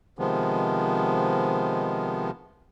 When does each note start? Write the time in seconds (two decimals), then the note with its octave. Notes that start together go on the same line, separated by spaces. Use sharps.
0.19 C3 D#3 F3 G#3 B3